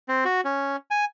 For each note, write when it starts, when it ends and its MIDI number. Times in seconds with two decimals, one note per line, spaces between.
0.08 0.24 60
0.25 0.41 66
0.45 0.76 61
0.91 1.05 80